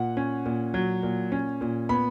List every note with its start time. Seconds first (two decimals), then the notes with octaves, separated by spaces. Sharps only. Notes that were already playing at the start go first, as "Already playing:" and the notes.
Already playing: A#2 F#5
0.17 C#4
0.46 A#2
0.74 F#3
1.03 A#2
1.32 C#4
1.61 A#2
1.89 B3 B5